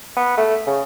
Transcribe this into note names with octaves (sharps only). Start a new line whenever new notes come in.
B3
A3
C#3